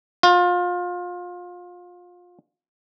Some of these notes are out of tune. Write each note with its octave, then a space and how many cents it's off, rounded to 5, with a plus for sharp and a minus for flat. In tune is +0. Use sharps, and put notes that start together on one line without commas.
F4 +25